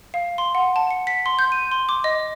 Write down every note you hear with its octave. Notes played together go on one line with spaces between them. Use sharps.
F5
C6
F#5
A5
C#7
B6
C6
G6
D#7
C6
D6
D#5